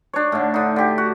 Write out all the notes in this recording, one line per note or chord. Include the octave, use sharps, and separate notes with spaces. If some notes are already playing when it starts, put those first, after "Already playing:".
D4 C#5
A2 D3
D3 D#4
D3 G4
F#4